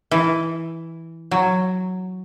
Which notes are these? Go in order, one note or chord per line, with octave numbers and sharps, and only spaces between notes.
E3
F#3